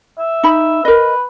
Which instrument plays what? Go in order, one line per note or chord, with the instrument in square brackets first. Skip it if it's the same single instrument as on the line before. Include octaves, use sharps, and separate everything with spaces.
[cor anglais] E5
[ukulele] D#4 B5
[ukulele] A#4 D#5 [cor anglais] B4